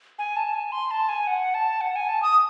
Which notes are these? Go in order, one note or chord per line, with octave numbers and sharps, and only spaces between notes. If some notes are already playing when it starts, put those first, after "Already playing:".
G#5
A5
G#5
C6
A5
G#5
F#5
A5
F#5
G#5
A5
D#6